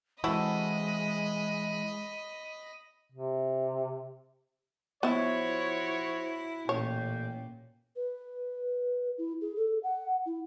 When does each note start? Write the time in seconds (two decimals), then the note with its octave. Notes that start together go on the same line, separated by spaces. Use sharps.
0.24 E3 G#3 C4 E4 F#4 A4 D#5 B5
3.12 C3
5.03 F3 B3 E4 F#4 C5 C#5 E5
6.69 A1 A#2 C#4 C#5 G5
7.96 B4
9.18 E4
9.41 G#4
9.56 A4
9.83 F#5
10.26 E4